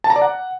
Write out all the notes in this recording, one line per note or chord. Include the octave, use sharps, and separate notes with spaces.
A5
A#5
D5
F#5